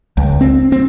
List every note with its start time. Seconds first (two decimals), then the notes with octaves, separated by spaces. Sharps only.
0.17 C#2
0.41 C4
0.72 C4